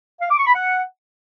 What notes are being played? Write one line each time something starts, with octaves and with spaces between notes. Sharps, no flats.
F5
D6
C#6
B5
F#5